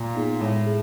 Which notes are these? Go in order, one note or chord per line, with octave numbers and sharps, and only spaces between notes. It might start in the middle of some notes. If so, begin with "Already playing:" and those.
Already playing: A#2
B3 D#4 G#4
A2 G#3
G#4